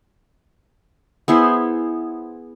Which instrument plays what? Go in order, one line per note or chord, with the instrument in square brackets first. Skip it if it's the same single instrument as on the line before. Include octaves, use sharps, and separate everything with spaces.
[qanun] B3 E4 G#4 C5